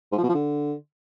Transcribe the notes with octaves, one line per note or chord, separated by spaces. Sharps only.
G#2
F3
B2
F3
D3